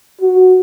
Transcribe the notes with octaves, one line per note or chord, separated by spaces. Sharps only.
F#4